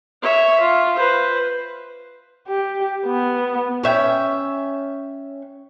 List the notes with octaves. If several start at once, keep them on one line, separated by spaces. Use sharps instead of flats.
C#5 E5
F4
B4 C5
G4
B3
C#4 E5 G5